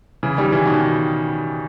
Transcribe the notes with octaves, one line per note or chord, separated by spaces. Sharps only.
C#3 E3
D#3 G3
C#3 E3
B2 D#3